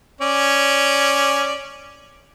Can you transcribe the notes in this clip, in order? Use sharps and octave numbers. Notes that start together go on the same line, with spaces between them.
C#4 D5